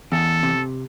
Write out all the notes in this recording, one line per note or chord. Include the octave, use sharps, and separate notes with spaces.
E2 A4
C3